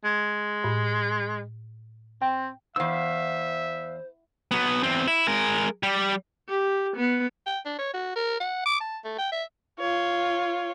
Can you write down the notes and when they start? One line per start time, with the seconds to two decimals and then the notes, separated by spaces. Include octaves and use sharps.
0.04 G#3
0.64 A2
2.22 C4 G5
2.76 E2 G#2 C5 E5 F5 E6
4.51 F#3 B3
4.83 E2 C4
5.08 E4
5.27 G#3 A#4
5.83 G3 G4
6.49 G4
6.97 B3
7.47 G5
7.65 D4
7.79 C#5
7.94 F#4
8.16 A#4
8.40 F#5
8.66 D6
8.80 A5
9.04 A3
9.19 G5
9.32 E5
9.79 F4 C#5